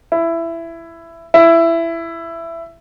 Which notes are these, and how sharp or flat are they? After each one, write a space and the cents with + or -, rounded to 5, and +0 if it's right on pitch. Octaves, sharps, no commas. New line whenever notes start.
E4 +15
E4 +15